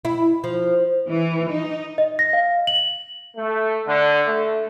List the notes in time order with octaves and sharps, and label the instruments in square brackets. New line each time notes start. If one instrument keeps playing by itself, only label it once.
[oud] E4
F3
[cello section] E3
D#4
[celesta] D#5
A#6
F5
F#7
[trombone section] A3
D3
A3